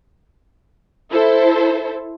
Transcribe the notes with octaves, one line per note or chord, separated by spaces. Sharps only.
E4 A4 C5